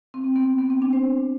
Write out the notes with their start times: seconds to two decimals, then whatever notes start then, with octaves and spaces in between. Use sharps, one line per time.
0.14 C4
0.24 C4
0.36 B3
0.58 B3
0.70 C4
0.82 D4
0.93 C5